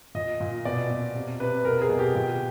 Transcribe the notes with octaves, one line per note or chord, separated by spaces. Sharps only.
A#2 D#5
A#2
B2 D5
B2
C3
C3 B4
B2 A#4
G#4
B2
G4
A#2